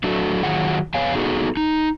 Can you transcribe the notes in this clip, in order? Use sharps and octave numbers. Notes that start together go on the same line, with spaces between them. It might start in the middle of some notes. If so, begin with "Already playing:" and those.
F#3 A3 D4 F#4 A4
D#3 F#3 G3 F4 G#4 F#5
F2 B3 C#5 F5 G#5
B3 D#4 F#4 G#4 A4
D#4